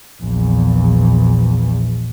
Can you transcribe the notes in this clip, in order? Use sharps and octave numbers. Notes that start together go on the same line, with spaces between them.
A#1 E2